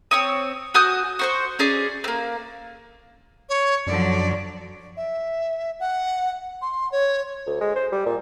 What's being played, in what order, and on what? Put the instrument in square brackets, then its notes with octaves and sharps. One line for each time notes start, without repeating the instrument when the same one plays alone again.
[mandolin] C4 C#5 D#6
F#4 G#5 D#6 G6
F#4 C5 C#6
C#4 G#4 D5
A#3 C4
[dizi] C#5
[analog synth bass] F#2 [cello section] D3 F3 F#3 [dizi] D5
[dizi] E5
F#5
C6
C#5
[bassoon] D2
G#3
C5
G3
A#2